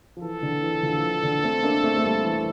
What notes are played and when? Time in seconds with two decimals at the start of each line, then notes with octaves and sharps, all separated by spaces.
0.17 F3
0.22 E3 A4
0.43 D3
0.63 E3
0.83 D3 F3
0.94 F3
1.03 E3
1.23 D3
1.44 A3 C4
1.63 A#3 D4
1.84 A3 C4
1.97 A3
2.04 G3 A#3
2.24 E3